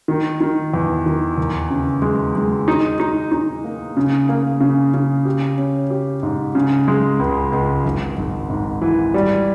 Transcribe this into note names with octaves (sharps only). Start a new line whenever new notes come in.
D#3
D#3
E2
D#3
D#2
C#3
G#3
G#3
D#4
D#4
D#4
A#3
C#3
A#3
C#3
C#3
G4
C#4
G4
G#2
C#3
G#3
C#2
C#2
G#1
G#1
G#2
E3
G3